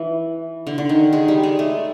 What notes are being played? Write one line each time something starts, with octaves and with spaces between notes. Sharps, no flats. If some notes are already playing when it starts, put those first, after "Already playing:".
Already playing: E3
D3
D3
D#3
G#3
G3
G#3
A3